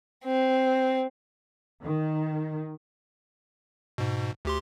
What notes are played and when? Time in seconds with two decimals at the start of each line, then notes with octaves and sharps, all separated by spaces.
0.24 C4
1.83 D#3
3.98 G#2 B2
4.45 D2 G4 C6